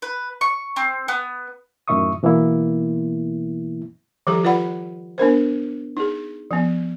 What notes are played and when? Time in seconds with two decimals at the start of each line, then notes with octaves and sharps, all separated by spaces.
0.02 B4
0.41 C#6
0.76 C4
1.08 B3
1.88 F#2 A2 D#3 E5 C#6 D#6
2.23 B2 E3 A#3 B3 E4
4.27 D#3 F3 G3 G4 A4 A#5
4.43 F4 G4 B4 D5 F#5 B5
5.18 B3 D4 A#4 C5
5.97 D#4 G#4
6.51 F3 B3